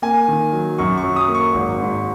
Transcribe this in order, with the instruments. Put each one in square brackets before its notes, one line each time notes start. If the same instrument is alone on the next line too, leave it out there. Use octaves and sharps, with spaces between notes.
[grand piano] A#3 G#5
D#3
F#3
F#2 C#6
C#6
F#3
D#6
A#3
C#6
G#1
G#2